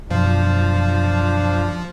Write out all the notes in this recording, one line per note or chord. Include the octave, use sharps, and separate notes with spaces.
F#2 B2 F3 D4 C5 F5